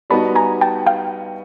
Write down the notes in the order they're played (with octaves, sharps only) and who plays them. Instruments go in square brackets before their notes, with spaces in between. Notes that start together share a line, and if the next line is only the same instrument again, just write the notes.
[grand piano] G3 B3 D#4 F#4 [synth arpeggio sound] A5 B5
[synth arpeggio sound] G#5 A#5
G5 A5
F5 G5